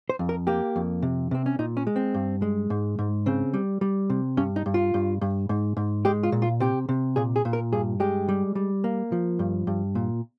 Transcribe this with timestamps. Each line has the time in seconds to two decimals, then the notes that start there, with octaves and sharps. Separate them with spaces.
0.09 C5
0.19 F2
0.29 A#4
0.47 A#3 G4
0.76 F2
1.02 C3
1.31 C3 C4
1.46 C#4
1.59 A#2 D#4
1.77 C#4
1.87 G#3
1.96 C4
2.14 G2
2.42 G#3
2.70 G#2
2.99 G#2
3.26 C#3 C4
3.54 G3
3.81 G3
4.10 C3
4.37 G2 C#4
4.56 D#4
4.66 G2
4.74 F4
4.94 G2
5.21 G2
5.49 G#2
5.77 G#2
6.05 G#3 G4
6.23 F4
6.32 A#2
6.42 F4
6.60 C3 G4
6.89 C3
7.16 A#2 G#4
7.36 G#4
7.45 A#2
7.53 A#4
7.72 G2 G#4
8.00 G#3 G4
8.29 G3
8.55 G3
8.84 A#3
9.12 F3
9.39 G2
9.67 G2
9.95 A#2